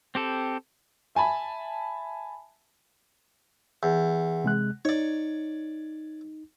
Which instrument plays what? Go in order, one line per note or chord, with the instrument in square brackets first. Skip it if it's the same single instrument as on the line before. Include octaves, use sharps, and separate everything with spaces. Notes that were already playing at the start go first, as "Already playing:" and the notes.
[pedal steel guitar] C4 G4 A4
[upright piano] E5 G#5 A5 B5
[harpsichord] E2
[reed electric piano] C3 G#3 F#6
[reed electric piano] D#4 [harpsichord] C#5 D5